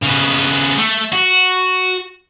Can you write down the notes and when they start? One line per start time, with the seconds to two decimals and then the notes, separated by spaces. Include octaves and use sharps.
0.02 C#3 B3
0.78 A3
1.13 F#4